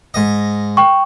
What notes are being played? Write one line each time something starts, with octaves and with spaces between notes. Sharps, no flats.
G#2 D#5
G5 C#6